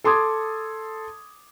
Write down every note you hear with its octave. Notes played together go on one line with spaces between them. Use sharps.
A4 C6 D6 D#6 G#6